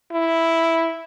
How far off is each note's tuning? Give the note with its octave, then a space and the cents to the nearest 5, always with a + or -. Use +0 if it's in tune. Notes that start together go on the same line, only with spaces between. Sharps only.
E4 +0